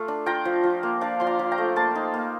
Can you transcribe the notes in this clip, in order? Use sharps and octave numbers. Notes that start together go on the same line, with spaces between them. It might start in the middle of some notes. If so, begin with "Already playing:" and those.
Already playing: A3 F4
D4
F4 G5 A#5
F3
F3
A#3
D4 D5 F5
F3 C6
A#5 D6
F3
G5 A#5
A3
A#3 A5 C6
D#4
A#3